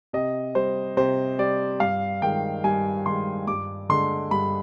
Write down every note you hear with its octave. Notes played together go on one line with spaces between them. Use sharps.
C3 D#5
G3 C5
C3 C5
G3 D5
G2 F5
D#3 G#3 G5
G2 G#5
D#3 G#3 C6
G2 D6
D3 G#3 C6
G2 B5